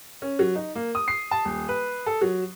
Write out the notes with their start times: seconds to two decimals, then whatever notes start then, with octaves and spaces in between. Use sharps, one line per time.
0.22 C#4
0.39 F#3
0.56 D#4
0.75 A#3
0.95 D#6
1.08 C7
1.31 A5
1.45 D#1
1.69 B4
2.06 A4
2.21 F#3